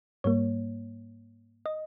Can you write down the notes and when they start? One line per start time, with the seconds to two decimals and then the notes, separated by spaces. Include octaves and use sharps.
0.24 G#2 G3 A#3 C#5
1.66 D#5